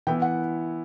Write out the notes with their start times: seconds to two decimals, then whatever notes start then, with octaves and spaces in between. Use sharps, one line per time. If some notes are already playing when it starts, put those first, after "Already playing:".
0.07 E3 B3 E4 G5
0.22 F#5